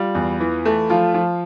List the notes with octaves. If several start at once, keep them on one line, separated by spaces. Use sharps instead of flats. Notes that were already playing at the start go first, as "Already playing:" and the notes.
Already playing: G3 F4
E2
E3
A3
F3 F4
F3